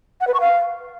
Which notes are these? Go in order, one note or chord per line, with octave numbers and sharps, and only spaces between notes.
F#5
B4
C#6
F5